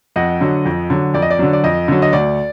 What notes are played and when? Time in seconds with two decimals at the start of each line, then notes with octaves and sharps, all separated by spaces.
0.16 F2 D#5 F#5
0.41 D3 F#3
0.65 F2
0.90 D3 F#3
1.14 F2 D5
1.22 D#5
1.30 D5
1.39 D3 F#3
1.53 D5
1.64 F2 D#5
1.88 D3 F#3
2.02 D#5
2.13 D2 D5